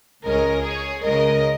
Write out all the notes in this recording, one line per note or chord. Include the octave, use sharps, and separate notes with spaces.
C#2 C#3 G#3 C#4 A#4 D#5
G#4 C#5
C#2 C#3 G#3 A#4 D#5